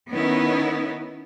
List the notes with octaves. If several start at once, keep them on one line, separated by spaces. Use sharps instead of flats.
D#3 B3 C#4 D#4 E4